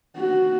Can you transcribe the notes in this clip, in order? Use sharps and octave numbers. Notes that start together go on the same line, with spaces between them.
F#4